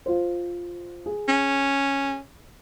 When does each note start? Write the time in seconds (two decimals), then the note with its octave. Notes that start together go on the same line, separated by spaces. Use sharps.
0.06 F4 C5
1.06 G#4
1.28 C#4